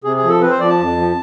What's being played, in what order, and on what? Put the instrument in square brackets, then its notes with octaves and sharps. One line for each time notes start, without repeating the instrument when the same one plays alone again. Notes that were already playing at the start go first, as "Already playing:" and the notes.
[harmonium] C3 G#4
G#4
F3
A4
C4 B4
C5
F3 D5
A5
F2
F3